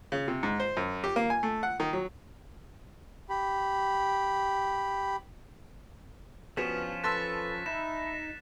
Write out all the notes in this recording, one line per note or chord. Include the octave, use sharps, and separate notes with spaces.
C#3
C3
G#2
C5
F#2
G4
A#3
G#5
A3
F#5
D#3
F#3
G4 B5
G2 F3 B3 C#4 F4 F#4 B6 E7
A4 B4 A5 C6 E6 F#6 A6 B6
D#4 E5 B5 E7